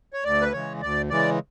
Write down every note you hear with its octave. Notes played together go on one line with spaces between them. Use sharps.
C#5
D2 D5
B4
C#3 E3 G#3 C#5
D2 D5
C#3 E3 G#3 D5